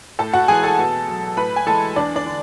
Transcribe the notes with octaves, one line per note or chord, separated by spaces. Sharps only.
A2 A4 A5
F#4 F#5
E3 G#3 G#4 G#5
A4 A5
B2
F#3
A2 B4 B5
G#5
E3 G#3 A4 A5
E2 D4 D5
D4 D5
D3